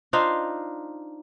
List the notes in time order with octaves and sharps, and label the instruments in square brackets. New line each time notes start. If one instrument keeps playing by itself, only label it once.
[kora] D4 D#4 F4 C5